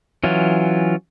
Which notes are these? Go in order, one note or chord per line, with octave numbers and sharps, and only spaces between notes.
E3 F#3 C#4 F4